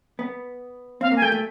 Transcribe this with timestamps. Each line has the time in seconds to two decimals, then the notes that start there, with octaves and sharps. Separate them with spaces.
0.19 B3
1.01 C4 F5
1.12 A#3
1.16 G#5
1.22 A3 G5
1.32 A3